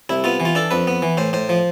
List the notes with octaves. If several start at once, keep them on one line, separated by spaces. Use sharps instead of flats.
C2 E4
B3 F4
E3
F4
D4 A4
F2 B4
B3
E3
A2 C5
A2 C5
F3